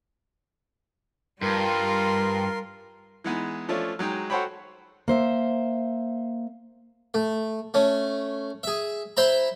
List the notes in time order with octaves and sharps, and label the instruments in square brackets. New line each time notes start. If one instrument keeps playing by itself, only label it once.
[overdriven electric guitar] G2 [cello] G3 F4 [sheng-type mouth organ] A#4 C6
[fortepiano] E3 G#3 B3 D#4
F3 A3 C#4 D4 F4
F#3 G#3 D#4 G5
F#4 A4 C5 C#5 G5 B5
[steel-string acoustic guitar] A#3 C5 E5
[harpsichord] A3
A3 C#4
G#4 E5
E4 C5 E5 A#5 B5